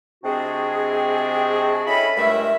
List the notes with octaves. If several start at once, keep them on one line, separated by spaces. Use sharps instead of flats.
C3 G#3 C4 D4 F#4 G#4
C#4 E4 A4 D#5 B5
C#2 G2 G#3 A3 A#4 E5